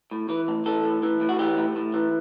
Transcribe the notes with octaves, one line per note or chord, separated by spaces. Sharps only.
A2
E3 B4
A2
E3 A4
A2
E3
A2
F#4
E3 G4
A2
A2
E3